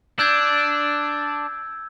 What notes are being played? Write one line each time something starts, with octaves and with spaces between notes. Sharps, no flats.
D4 E6 G6 G#6